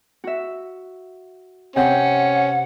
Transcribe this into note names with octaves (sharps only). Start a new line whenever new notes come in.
F#4 E5
C3 C#4 F#5 G6